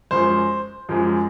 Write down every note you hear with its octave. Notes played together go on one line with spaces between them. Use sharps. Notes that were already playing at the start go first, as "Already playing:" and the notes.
F#2 F3 G#3 C5
F#2 F3 G#3